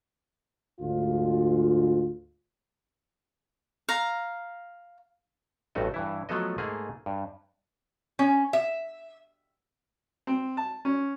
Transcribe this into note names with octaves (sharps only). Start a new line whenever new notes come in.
D2 G#2 F4
F5 A#5
A1 G2 A3 F#4 D#5
G2 E3 E4
F3 F#3 A3 B3 A4 D#5
G#2 A3 A#3 G#4
G2
C#4
E5
C4
A5
C#4